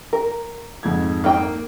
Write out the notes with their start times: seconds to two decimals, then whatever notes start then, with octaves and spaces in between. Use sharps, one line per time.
0.13 A#4
0.83 F2 G#2 G#6
1.24 A#3 D#4 G5